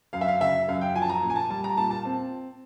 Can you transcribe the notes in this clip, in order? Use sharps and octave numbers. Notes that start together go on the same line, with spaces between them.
F#2 F5
E5
F5
C#3 E5
F#2 F5
G5
F3 G#5
A5
A#5
A#2
G#5
A5
G3 A5
A#5
A#2 A5
A5
C4